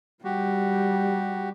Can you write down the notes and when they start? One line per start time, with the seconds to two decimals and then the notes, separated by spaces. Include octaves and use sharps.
0.24 G3 F#4 G4